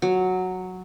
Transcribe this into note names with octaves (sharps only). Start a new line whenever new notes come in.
F#3